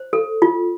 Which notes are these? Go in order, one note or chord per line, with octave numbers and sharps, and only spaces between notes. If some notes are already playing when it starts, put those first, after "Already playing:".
Already playing: C5
A4
F4